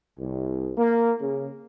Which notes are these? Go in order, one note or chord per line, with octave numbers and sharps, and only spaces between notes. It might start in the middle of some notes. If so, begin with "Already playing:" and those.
C2
A#3
C#3